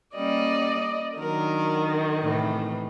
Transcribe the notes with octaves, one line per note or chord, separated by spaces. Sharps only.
G3 A#3 C#4 D5 D#5
D#3 F#3 D4 A#4
A2 C3 E3